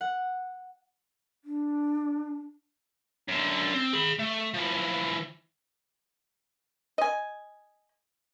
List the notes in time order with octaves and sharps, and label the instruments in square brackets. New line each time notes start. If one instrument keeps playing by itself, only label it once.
[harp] F#5
[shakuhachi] D4
[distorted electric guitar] F#2 D3
C4
G#4 B5
A3
E3 F3
[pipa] D#5 G#5